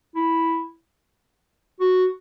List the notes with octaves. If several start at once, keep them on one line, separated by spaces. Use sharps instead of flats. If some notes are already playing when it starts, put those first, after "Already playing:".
E4
F#4